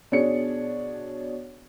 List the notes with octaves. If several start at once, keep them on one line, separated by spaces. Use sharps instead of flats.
B2 D4 G#4 C#5 C#7